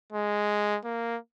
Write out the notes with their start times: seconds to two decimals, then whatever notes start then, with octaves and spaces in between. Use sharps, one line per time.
0.12 G#3
0.85 A#3